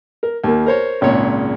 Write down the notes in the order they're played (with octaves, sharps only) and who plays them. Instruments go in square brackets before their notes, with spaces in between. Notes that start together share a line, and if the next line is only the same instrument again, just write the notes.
[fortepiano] A#4
D#2 A#3
A#4 C5 C#5
G#1 C#2 A#2 C#5